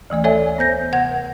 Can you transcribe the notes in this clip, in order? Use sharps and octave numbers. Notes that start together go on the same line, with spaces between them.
D2 E3 A3 D5
A4 C#5 D5 E5 G#5
B3 C5 G6 A#6
C3 F#5 G#6